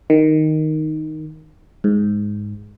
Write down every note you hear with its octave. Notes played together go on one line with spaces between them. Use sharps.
D#3
G#2